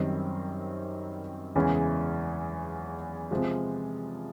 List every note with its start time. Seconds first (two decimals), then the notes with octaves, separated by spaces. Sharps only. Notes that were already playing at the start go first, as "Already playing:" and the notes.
Already playing: F#2 D#3 G3 C4 D#4
1.55 E2 C#3 E3 G#3 C#4
3.31 C3 F3 G#3